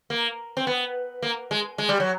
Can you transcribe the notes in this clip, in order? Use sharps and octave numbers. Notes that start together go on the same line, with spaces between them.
A#3
C4
B3
A#3
G#3
G#3
G3
F#3